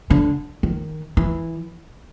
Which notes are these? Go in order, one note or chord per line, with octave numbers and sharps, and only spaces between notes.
D3
D#3
E3